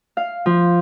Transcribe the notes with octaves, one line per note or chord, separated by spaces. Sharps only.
F5
F3